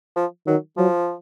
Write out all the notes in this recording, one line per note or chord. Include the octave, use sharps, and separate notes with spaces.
F3
D#3 F#3
F3 F#3